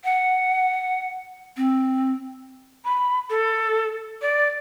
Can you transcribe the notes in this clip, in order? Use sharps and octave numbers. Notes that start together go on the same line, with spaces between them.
F#5
C4
B5
A4
D5